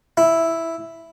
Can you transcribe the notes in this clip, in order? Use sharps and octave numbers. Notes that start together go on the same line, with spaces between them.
E4